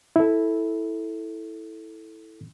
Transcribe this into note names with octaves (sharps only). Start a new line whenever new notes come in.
E4 A4